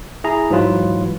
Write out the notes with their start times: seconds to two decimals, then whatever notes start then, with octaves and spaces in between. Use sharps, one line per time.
0.24 E4 G#4 A#5
0.50 G#2 E3 F#3 F4 B4